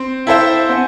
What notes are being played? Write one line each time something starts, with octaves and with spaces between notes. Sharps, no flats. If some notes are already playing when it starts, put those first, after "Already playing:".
Already playing: C4
E4 A4 C5 E5 F5 G5
C4 F#5 G#5